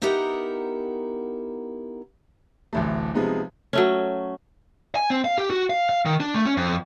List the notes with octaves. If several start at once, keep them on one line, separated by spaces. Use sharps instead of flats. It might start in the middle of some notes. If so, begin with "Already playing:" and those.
B3 D#4 E4 G4 A#4 F#5
D1 A1 A3
C3 F3 G#3 B3 D#4
F#3 A3 C#4
G#5
C4
F5
G4
F#4
F5
F5
D#3
D4
A3
C#4
F2